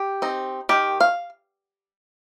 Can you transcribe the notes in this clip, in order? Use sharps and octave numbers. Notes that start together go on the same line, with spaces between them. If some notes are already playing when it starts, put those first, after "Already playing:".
Already playing: G4
C4 D#4
D#3 G4
F5